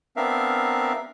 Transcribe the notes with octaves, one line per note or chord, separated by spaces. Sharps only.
B3 C4 D4 A#4 E5 F5